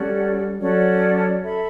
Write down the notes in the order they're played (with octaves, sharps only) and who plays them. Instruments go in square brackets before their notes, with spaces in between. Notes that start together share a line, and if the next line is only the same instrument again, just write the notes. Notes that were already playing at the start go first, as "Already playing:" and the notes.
Already playing: [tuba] G3 [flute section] C#4 F#4 A4 D5
[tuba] F#3 [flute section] C#4 F#4 A4 D5
[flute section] A4 E5 B5